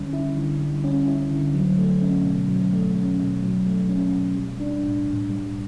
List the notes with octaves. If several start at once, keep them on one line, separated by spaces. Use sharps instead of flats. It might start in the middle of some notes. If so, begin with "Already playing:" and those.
Already playing: D3 G3 C#4
E4
D3
G3
C#4
E4
D3
F#3
A3
C#4
B2
F#3
A3
C#4
B2
F#3
A3
C#4
B2
G3
D4
A2
A2
G3